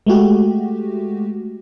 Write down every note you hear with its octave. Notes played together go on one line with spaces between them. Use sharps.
G#3 A3 F#4 G4